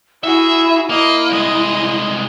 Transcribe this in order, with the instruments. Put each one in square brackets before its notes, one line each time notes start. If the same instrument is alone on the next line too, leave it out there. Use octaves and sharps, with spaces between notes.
[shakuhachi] E4 [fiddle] F#4 G#4 [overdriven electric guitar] E5
[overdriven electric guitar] A#3 [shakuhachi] E4 [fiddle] D#5
[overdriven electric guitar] C2 G#3 [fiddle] D#5